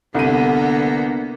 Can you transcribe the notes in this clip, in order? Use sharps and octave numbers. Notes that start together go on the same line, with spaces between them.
C2 D3 A#3 B3 D#7